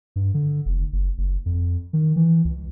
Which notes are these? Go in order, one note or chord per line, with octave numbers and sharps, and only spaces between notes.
G2
D3
F1
F#1
F#1
F2
D#3
E3
C#2